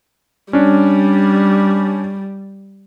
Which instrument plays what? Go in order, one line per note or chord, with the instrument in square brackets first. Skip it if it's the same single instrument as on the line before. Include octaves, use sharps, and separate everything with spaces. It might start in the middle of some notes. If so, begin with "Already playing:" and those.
[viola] G3 [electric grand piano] C#4 D4